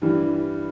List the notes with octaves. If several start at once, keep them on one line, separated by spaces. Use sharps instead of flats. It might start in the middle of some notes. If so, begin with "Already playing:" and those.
G2 E3 G3